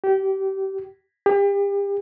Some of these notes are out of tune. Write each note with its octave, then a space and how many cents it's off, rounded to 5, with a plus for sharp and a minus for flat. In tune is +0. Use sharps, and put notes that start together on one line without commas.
G4 -25
G4 +35